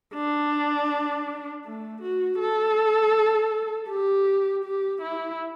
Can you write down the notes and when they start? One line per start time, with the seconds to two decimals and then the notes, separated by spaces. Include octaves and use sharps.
0.14 D4
1.64 A3
2.02 F#4
2.39 A4
3.89 G4
4.64 G4
5.02 E4